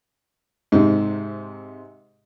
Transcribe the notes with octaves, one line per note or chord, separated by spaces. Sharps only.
G#2 C3